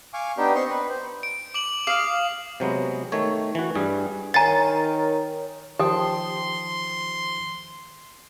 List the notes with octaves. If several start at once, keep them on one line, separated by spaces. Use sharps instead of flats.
F5 G#5 C#6 D6
B3 D4 D#4 G4 G5
C4 D#5 C6 C#6
B4
C5
D7
D6 D7 F#7
F5 D6 D#6
C3 F#3 G#3 B3
D#3 A3 C#5
E3 F#4
G2 G3 G#4
D#3 A#4 C#5 F#5 G#5 A#5 A6
D#3 F3 G4 C5 G5 A5 C6 D#6